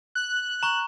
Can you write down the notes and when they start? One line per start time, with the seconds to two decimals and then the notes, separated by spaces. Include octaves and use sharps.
0.15 F#6
0.63 A#5 C#6